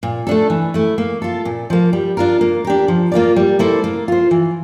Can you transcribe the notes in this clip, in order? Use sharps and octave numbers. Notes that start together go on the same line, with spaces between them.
A#2
A3 D4 A4
E3
A3 E4
A#3
F4 A4
A#2
F3 A#3
G3
D4 F4 A#4
A#3
D4 G4 A#4
F3
A#3 F4 A#4 D5
G3
A#3 E4 A4 C5
A#3
F4 C5
E3